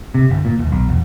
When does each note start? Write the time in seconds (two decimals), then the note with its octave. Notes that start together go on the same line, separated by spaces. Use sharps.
0.14 C3
0.31 G1
0.45 A#2
0.59 D#1
0.72 B1
0.89 E1